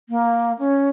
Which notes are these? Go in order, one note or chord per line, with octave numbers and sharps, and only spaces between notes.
A#3
C#4